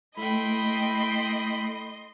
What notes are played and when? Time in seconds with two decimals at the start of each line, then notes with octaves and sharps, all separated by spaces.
0.17 A3 E4 A4 D#5 G5 B5 C6